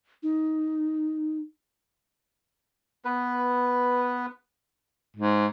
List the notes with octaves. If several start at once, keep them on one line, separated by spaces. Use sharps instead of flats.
D#4
B3 B4
G#2